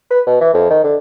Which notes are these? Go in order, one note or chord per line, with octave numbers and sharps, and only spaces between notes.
B4
B2
E3
F2
D#3
D3